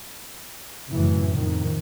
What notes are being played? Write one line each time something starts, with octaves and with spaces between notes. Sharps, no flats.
F1 F#2 A2 C#3 E3
F2 D#3